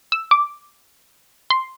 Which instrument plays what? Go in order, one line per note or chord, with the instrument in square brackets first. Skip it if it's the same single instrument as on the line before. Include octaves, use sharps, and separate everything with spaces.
[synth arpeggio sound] E6
D6
C6